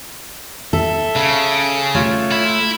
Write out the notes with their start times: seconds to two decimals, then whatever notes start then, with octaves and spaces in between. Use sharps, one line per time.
0.73 A4 E5
1.16 C#3
1.95 A3 F4 C#5
2.32 E4